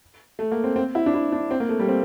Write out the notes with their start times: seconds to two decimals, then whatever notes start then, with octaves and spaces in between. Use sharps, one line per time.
0.39 A3
0.52 A#3
0.64 C4
0.76 C4
0.95 E4
1.06 D4
1.14 E4
1.32 D4
1.51 C4
1.60 A#3
1.69 A3
1.80 G3
1.88 C4